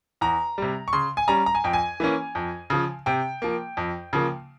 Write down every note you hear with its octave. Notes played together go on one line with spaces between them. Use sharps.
E2 A#5
C3 G3
C#6
C#3 C6
G#5
G3 C#4 A#5
A#5
G#5
F2 G5
G#5
E3 A#3 C#4
F2
C#3 F3
C3 G5
F3 A#3
F2
C#3 F3 A#3